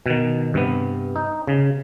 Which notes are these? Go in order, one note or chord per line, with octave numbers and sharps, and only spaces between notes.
B2 D#3
G2 C3 B3
D#4
C#3